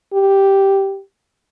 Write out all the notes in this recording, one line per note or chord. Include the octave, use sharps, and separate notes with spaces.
G4